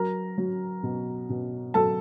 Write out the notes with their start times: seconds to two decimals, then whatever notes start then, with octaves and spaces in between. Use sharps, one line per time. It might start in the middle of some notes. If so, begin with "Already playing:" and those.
Already playing: F#3 A#4 A#5
0.38 F#3
0.83 B2
1.30 B2
1.74 F#3 A4 A5